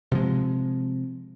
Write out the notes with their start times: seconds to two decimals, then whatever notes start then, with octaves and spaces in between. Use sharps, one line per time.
0.11 C3 F3 G#3